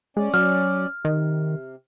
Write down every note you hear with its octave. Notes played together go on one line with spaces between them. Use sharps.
G#3 C#4 D5
F#3 F6
C3 D#3